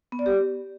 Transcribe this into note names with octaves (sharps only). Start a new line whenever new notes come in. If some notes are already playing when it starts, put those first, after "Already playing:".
B3
D5
G4